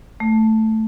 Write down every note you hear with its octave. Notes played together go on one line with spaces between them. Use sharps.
A3